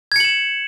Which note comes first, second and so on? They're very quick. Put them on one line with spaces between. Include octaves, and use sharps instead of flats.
G#6 C#7 F#7 E7